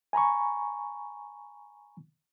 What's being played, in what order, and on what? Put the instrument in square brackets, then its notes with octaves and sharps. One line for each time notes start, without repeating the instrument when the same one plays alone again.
[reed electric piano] G#5 A#5 B5 C#6